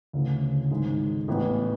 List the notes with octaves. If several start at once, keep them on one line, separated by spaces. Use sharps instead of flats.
D2 C#3 E3
G#1 G#2 G#3
A1 A2 E3 B3